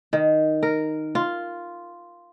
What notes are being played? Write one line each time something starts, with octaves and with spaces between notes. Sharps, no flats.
D#3
A#4
F4